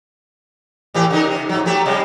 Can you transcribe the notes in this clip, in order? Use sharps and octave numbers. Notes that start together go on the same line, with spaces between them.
A2 E3 G4
C#3 D#4 A#4
C3
G#2 F#3
F#3 A3 G4
C3 G3 G#3